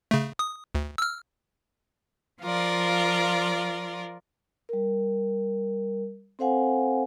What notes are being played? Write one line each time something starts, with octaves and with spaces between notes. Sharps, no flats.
C#3 A3
D#6
D2
E6 F6
F3 F4 A#4 D5
G3 A#4
C4 A4 C5 F5 F#5 G#5